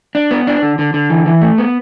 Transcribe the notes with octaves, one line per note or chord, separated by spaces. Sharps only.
D4
B3
D4
D3
D3
D3
E3
E3
A3
B3